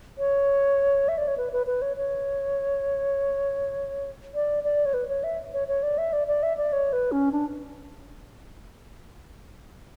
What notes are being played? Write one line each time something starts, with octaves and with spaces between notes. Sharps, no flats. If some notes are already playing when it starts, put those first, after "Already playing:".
C#5
E5
D5
C#5
B4
B4
B4
C#5
C#5
D5
D5
C#5
B4
C#5
E5
C#5
C#5
D5
E5
D5
D5
E5
D5
C#5
B4
C#4
D4